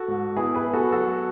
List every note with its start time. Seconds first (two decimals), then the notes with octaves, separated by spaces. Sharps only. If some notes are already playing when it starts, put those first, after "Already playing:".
Already playing: F#4 A4
0.08 G#2
0.36 B3 E4 G#4
0.54 G#4 B4
0.65 B3
0.74 F#4 A4
0.92 F#3 F#4 A4